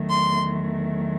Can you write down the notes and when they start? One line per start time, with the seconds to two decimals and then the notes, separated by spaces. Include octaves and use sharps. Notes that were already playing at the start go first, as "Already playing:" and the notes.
Already playing: E2 D#3 F#3 A3
0.09 C6